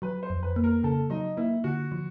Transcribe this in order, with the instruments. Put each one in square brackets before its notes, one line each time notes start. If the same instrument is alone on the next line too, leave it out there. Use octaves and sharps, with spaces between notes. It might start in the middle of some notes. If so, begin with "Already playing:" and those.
[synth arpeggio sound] F#3 [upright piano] B4
[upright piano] C5
[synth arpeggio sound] F2
[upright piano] B4
[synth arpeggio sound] A#3
[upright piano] A#4
[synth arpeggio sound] C#3 [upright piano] A4
[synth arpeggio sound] F#3 [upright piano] D#4
[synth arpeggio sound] A#3 [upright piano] E4
[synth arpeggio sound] D3 [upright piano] F#4
[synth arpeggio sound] F3